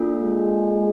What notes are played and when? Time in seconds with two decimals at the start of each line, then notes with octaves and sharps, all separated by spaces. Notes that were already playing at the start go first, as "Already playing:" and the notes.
Already playing: A#3 D4 F4 A4
0.20 G#3